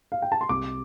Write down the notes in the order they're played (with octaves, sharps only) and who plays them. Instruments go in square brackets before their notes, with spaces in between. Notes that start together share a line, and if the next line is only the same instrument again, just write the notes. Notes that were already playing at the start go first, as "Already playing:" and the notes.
[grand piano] F5
G5
A5
C6
C2 D6